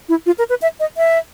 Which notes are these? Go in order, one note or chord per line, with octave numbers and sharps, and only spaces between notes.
E4
F4
A#4
B4
E5
D#5
E5